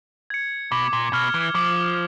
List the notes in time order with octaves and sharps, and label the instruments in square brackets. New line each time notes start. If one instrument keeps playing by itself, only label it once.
[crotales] G#6 C#7
[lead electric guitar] B2 [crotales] D6
[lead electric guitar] A#2
[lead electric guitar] B2 [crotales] F6 G#6
[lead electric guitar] E3
[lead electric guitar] F3 [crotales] D6